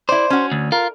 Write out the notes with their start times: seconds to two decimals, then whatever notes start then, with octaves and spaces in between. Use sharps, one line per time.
0.09 E4 C5 D5
0.30 C#4 F#4
0.52 D2
0.72 F4 A#4